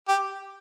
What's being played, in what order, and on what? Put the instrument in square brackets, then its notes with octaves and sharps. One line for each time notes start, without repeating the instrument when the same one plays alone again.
[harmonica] G4